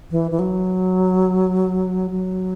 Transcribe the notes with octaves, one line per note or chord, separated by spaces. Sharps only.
E3
E3
F#3
F#3